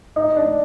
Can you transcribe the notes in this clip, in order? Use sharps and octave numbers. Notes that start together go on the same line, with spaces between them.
D#4
D4